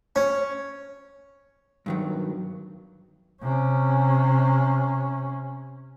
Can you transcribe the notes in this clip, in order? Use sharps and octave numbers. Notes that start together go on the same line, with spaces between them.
C#4
G2 D#3 F#3
C3 C#4